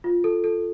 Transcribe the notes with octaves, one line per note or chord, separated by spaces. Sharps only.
F4
A4
A4